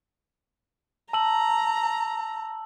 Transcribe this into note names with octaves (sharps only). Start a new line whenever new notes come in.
A5 A#5 E6 F#7